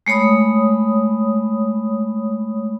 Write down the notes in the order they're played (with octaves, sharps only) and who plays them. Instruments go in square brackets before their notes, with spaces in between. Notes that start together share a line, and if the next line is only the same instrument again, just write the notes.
[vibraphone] G#3 A3 C#5 B5 D#6